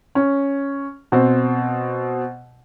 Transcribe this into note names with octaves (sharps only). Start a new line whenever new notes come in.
C#4
B2 C4